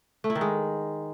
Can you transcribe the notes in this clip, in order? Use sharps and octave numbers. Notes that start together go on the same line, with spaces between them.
A3
E4
D#3
G#3